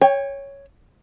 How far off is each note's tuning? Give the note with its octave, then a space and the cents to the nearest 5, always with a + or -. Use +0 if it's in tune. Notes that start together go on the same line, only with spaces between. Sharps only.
C#5 +0 G5 +35